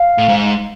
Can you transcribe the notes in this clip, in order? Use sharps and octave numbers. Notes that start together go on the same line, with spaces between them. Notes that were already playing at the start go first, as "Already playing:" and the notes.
Already playing: F5
A2
G#2